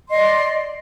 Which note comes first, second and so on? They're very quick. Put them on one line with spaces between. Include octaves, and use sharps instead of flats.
C6 D#5 D5